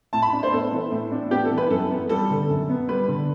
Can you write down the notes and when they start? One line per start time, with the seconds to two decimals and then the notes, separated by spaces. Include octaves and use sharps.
0.13 A2 A5
0.22 B5
0.33 D4
0.43 C5
0.52 B3 A4
0.72 E3
0.91 A2
1.12 D4
1.31 B3 G4
1.45 A4
1.51 E3
1.58 B4
1.70 F#2 A4
1.91 B3
2.09 G3 A4
2.30 D3
2.49 F#2
2.69 B3
2.89 G3 B4
3.08 D3